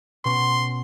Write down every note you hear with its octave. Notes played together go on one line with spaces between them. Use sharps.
B2 C#4 C6 C#6